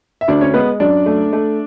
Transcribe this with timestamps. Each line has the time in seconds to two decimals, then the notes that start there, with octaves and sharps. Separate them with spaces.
0.21 E5
0.28 D2 D4 D5
0.41 C#4 C#5
0.54 G#3 B3 B4
0.80 F#2 D4 D5
1.06 A3
1.33 A3